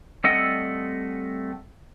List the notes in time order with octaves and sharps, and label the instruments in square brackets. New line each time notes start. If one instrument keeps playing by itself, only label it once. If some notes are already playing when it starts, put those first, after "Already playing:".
[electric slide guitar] G3 A3 C4 A4 D#5 F#5